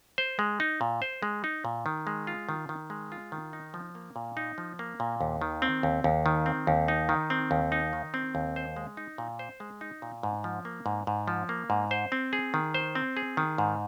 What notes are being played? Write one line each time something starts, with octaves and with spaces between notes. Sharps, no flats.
C5
G#3
D#4
A#2
C5
G#3
D#4
A#2
D#3
G#3
F4
D#3
D#3
G#3
F4
D#3
D#4
F3
A#3
A#2
D#4
F3
A#3
A#2
D#2
D#3
C4
D#2
D#2
D#3
C4
D#2
D#4
D#3
C4
D#2
D#4
D#3
C4
D#2
C5
G#3
D#4
A#2
C5
G#3
D#4
A#2
G#2
F3
A#3
G#2
G#2
F3
A#3
G#2
C5
C4
G#4
D#3
C5
C4
G#4
D#3
G#2